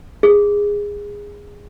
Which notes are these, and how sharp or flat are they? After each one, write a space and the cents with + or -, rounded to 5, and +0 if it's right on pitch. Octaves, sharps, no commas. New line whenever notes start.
G#4 -15